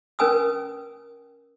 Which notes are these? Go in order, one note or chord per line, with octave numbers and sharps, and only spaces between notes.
C#4 A#4 B4 G#5 D#6 E6